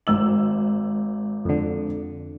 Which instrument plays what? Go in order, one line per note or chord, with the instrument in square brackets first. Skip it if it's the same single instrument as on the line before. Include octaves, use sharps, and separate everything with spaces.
[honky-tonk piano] G#1 E6 F#7
[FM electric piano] F2 D3